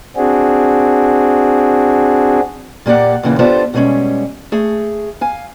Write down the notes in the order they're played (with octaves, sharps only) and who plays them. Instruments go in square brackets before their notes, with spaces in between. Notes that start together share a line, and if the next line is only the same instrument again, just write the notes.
[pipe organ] C4 D4 F#4 G#4
[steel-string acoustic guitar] A#2 A#3 G4 D5 F#5
D#2 A#2 C#3 E3
B3 D4 F4 G4 A4 C5
B2 G3 G#3 A#3 C#4
A3 G#4
F5 G#5